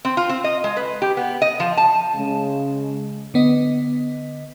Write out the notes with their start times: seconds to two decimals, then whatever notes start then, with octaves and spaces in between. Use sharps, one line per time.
0.05 C4
0.17 F4
0.29 C4
0.44 D#5
0.64 G#3
0.77 B4
1.02 G4
1.17 B3
1.42 D#5
1.60 F3
1.77 A5
2.16 C#3 G#3
3.34 D3 B3 D#5